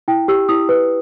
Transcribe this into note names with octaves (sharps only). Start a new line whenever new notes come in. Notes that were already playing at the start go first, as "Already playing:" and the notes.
E4 G5
G4 E6
E4 D#6
B4